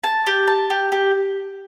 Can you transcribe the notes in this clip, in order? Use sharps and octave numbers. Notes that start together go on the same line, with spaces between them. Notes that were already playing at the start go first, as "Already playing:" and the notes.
A5
G4
A5
G4
G4